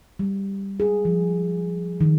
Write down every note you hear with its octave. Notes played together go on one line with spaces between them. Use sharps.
G3
G#4
F3
D#3